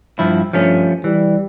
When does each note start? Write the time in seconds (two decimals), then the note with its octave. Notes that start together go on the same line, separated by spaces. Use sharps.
0.19 G2 F3 E4
0.53 G2 F3 A3 C#4
1.04 E3 G3